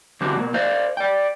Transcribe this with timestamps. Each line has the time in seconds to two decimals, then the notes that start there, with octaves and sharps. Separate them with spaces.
0.21 D3 G3 C4 D4 F#4
0.36 B2 A#3
0.54 C5 D5 F5
0.97 D5 G5